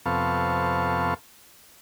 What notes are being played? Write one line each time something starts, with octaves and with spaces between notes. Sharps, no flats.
F2 C3 B3 A4 F5 C#6